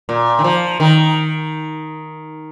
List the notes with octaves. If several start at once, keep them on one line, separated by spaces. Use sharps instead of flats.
A#2
D#3
F3
D#3